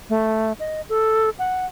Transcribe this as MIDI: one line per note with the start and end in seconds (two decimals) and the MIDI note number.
0.10 0.53 57
0.60 0.81 75
0.89 1.30 69
1.39 1.66 78